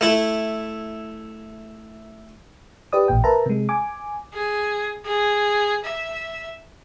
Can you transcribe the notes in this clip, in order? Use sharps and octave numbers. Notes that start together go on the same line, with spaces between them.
A3 E4
G4 B4 D5 D#6
A1 A#2 G5
A#4 B4 E5 A5 A#5
C3 G#3
G#5 D6
G#4
G#4
E5